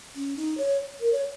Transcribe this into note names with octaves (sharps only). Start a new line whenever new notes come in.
C#4
D#4
C#5
A#4
C#5